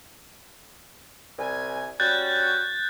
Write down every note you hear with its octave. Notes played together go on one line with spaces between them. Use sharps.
C2 G#5
G3 C#4 F#4 F#6 G6 A6